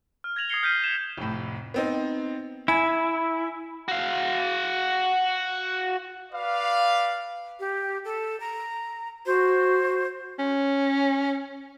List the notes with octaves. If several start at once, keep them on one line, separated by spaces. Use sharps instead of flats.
F6
G#6 A#6 F7 F#7
D#6 G#6 A#6 C7 C#7 G7
F6 G6 B6 C7 D#7
E7
F1 A2
B3 C4 D#4
E4 G#5 G#6
F#4 F5
B4 D5 F5
G4
A4
A#5
F#4 C5
C#4